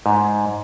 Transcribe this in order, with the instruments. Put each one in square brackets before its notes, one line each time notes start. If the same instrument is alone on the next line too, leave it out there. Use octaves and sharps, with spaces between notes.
[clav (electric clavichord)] G#2